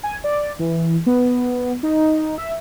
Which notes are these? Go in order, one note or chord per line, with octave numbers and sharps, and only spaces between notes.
G#5
D5
E3
B3
D#4
E5